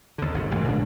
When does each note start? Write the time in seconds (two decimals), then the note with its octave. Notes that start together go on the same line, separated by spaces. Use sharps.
0.18 D#2 D3
0.34 G#1 C3
0.51 F#1 G#2 E3 A3
0.64 A#2 C#3 G#3 D4